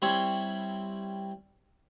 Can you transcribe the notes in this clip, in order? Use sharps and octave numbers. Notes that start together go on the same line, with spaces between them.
G3 C4 E4 C#5